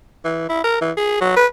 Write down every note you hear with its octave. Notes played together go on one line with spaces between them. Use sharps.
E3
E4
A#4
E3
G#4
F#3
B4